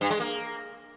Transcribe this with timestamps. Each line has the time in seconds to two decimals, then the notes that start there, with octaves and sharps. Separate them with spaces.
0.01 G2
0.10 G#3
0.20 A#3